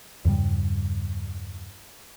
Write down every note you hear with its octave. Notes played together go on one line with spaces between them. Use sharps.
E2 G2 C#3 G3